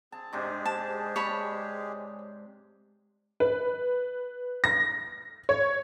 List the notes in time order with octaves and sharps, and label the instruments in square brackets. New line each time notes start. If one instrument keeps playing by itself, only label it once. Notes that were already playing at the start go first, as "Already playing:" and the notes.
[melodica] C4 G#4 [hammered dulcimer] A5
[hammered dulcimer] G#2 C3 D4 [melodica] G#3 G4 G#4
[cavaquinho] A5
C#5 A5 B5
[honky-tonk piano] B4
A#6
C#5